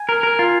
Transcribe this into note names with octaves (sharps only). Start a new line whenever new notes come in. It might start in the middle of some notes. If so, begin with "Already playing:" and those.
Already playing: G#5
A#4
A#4
F4